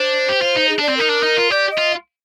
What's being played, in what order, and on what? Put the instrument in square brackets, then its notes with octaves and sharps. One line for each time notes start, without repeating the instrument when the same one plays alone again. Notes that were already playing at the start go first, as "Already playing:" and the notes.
Already playing: [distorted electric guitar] D4 [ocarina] C5
[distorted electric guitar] G4
F4
D#4
[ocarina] G#4
[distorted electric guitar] D4 [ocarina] D5
[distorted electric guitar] C4
[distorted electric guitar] D#4 [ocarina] A#4
[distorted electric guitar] D4
D#4
F4
[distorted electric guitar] G4 [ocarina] D5
[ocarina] D#5
[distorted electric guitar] F4